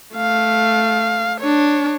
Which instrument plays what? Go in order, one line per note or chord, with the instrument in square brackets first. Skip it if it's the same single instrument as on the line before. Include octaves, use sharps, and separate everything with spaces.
[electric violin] A3 F5
D4 C#5